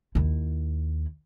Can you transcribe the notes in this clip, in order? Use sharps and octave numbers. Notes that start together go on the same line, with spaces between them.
D#2 E4